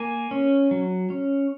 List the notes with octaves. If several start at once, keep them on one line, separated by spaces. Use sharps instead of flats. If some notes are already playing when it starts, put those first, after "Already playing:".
Already playing: A#3 G#5
C#4
F#3
C#4